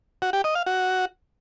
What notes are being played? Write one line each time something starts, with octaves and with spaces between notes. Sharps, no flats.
F#4
G4
D#5
F5
F#4